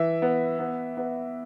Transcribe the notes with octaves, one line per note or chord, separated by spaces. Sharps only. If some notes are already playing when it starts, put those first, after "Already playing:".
Already playing: E3 E5
B3
B3
B3